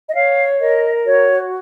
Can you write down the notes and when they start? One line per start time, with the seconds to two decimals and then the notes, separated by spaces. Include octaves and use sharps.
0.09 D#5
0.14 C#5 F5
0.59 A#4 D#5
1.06 F#4 C#5